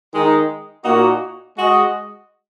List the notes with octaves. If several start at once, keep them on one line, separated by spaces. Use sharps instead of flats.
D#3 G#3 D#4
A#2 A#3 D#4 F#4
G#3 F#4 D#5